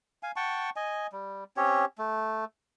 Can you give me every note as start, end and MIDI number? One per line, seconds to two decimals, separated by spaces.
0.23 0.32 77
0.23 0.32 80
0.36 0.70 78
0.36 0.70 79
0.36 0.70 81
0.36 0.70 85
0.76 1.07 75
0.76 1.07 80
1.12 1.44 55
1.57 1.85 60
1.57 1.85 61
1.57 1.85 67
1.57 1.85 73
1.98 2.45 57